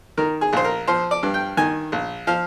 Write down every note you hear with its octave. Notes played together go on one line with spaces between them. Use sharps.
D#3 A#4
G#4
A#1 C5
A#4
F3 C5
D5
G2
G5
D#3 G#5
A#1
F3 F5